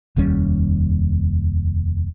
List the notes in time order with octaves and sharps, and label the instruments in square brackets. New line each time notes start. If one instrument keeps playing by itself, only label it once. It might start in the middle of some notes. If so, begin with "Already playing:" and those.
[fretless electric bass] F1 D#2 G3 C#4